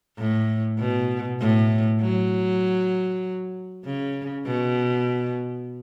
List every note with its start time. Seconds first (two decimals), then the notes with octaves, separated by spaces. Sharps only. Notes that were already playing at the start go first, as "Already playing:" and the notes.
0.18 A2
0.79 B2
1.40 A2
2.01 F#3
3.85 C#3
4.46 B2